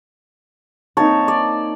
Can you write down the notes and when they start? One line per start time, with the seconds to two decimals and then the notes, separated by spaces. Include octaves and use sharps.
0.97 A#3 C4 D#4 C#5 A5
1.28 D5